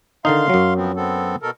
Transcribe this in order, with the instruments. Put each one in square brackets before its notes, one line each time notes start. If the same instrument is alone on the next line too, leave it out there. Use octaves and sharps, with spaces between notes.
[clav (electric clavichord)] D3 D#3 D#4 [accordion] F5 C6
[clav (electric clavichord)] F#2 F#3
[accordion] F3 B3 C4
B3 C4 A4
B2 A4 A#4